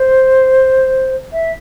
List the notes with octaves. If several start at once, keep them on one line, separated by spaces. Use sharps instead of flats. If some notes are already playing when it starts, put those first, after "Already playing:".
Already playing: C5
E5